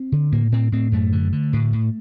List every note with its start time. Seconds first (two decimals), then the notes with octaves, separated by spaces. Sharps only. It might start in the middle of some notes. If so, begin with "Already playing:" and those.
Already playing: C4
0.12 D3
0.32 A2 A#3
0.52 A2 C4
0.72 A2 C4
0.92 F#2 A3
1.12 D3
1.32 D3
1.53 A2
1.73 A2